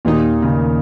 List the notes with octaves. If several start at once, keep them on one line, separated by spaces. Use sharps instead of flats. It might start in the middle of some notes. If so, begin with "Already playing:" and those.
D#2 A#2 D#3 A#3 D#4
C#3